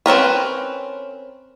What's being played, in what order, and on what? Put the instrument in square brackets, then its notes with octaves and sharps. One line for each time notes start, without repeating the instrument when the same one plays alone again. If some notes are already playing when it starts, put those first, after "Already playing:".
[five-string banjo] C4 C#4 A#4 B4